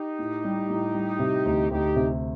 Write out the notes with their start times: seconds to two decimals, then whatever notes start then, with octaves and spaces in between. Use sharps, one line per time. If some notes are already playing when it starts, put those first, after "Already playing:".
Already playing: D#4 G4
0.19 A2
0.44 G3
0.70 A2
0.94 G3
1.19 C3
1.45 D2
1.70 D2 D#4 G4
1.96 C3